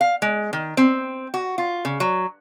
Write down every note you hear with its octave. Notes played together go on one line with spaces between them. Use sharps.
F5
G#3
D#3
C4
F#4
F4
C#3
F#3